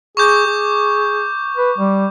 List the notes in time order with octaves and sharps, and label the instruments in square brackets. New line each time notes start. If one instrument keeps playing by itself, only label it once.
[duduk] G#4 [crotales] C#6 D6 G6
[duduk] G#4
B4
G3